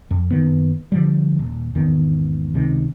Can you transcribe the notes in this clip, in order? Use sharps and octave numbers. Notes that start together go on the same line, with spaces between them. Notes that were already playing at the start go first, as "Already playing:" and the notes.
F2
F#1 D#3 B3
D3 F3 G3
D#1
G#1 E2 D#3 B3
C#2 C3 D#3